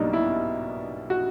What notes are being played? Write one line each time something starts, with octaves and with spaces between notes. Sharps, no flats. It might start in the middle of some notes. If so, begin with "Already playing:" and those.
Already playing: B1 B2 G3 A#3 D4 D#4
E4
F#4